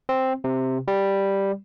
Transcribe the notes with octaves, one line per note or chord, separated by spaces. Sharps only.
C4
C3
G3